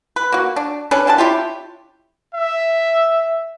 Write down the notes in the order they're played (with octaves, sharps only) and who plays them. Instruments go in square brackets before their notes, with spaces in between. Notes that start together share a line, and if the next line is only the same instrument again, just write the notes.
[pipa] B4
A#3 F#4
D4
C#4 D4 A4 B4
A#3 D4 G4 A5
C#4 E4 F4 G4
[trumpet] E5